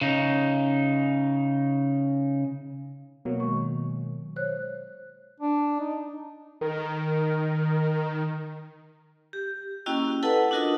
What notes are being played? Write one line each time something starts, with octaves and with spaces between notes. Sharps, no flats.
C#3 D#4
B2 F#3 A#3
D#3 G#3 C#6
C5 C#5 F#6
D4
D#4
D#3 A#4
G4
A#3 C#4 E4 F#4 D#5 G5
E4 A4 B4 D#5 F#5 A5
D4 F4 F#4 A#4 D#5 D#6